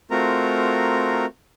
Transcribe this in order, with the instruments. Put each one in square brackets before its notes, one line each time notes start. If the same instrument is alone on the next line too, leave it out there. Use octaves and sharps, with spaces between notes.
[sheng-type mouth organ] A3 C4 F4 F#4 A#4 A#5